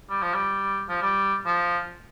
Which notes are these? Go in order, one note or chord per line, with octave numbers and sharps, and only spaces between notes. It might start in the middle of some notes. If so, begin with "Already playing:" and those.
G3
F3
G3
F3
G3
F3